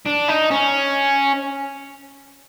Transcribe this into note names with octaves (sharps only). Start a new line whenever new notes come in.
D4
D#4
C#4